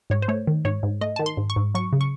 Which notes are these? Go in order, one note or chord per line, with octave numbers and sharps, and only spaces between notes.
G#2 C#5
C5
A3 C#5
D#3
G#2 C#5
G#2
A3 D#5
D#3 A5
C6
G#2
C#6
G#2
F#3 C#6
C#3
C#6